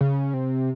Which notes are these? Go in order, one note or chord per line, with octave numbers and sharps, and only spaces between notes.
C#3
C3